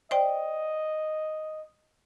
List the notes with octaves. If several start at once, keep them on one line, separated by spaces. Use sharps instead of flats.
C5 D5 D#5 G5